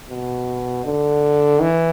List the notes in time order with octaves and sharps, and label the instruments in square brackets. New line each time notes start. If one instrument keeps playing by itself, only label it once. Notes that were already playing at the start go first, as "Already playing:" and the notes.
[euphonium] B2
D3
E3